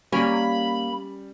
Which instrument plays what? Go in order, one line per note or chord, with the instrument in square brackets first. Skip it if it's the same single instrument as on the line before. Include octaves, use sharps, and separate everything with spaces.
[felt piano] G3 [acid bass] A#3 [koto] C#4 [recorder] B5